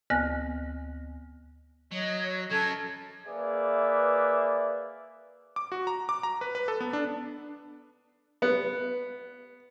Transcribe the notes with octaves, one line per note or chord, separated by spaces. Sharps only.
D2 B3 G#5 F#6 A#6
F#3 C#5 D#5
F#3 C#4 A4 G#6
A#3 G#4 B4 D5 E5
D6
F#4
A#5
D6
A#5
B4
B4
A4
B3
D4
B3